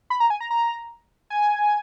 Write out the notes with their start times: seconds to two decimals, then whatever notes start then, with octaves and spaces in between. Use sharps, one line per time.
0.10 B5
0.20 A#5
0.30 G#5
0.41 A#5
0.51 A#5
1.30 G#5